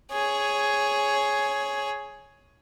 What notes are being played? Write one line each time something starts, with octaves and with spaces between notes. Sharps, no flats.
G#4 C#5